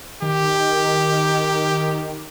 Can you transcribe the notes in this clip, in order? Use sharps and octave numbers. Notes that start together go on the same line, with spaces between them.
D#3 G4